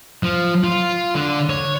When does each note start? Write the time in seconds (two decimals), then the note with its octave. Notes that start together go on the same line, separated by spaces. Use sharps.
0.23 F3
0.64 F4
1.15 D3
1.50 C#5